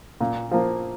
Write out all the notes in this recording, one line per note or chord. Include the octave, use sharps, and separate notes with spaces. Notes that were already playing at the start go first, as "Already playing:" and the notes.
A#2
F3 A#3